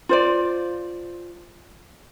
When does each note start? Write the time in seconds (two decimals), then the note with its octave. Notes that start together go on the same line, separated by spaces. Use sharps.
0.09 F4 C5 D5